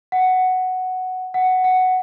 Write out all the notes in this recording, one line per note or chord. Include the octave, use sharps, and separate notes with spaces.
F#5
F#5
F#5